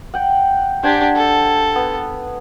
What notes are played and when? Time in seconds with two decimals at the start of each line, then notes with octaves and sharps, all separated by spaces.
0.14 F#5 G5
0.83 D4 G4 C5 F#5 G#5
1.16 A4
1.76 B3